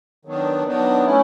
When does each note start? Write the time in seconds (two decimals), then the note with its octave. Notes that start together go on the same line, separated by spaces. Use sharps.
0.25 D#3 F#3 B3 D4
0.65 D#3 F#3 B3 D4
1.05 A3 C#4 E4